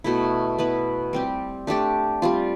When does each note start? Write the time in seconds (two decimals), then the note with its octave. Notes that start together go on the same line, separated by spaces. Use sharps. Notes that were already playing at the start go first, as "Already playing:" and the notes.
0.04 B2 A3 E4
0.58 B3 E4 B4
1.13 G3 C4 G4
1.67 A3 D4 G4 D5
2.22 G3 C4 F4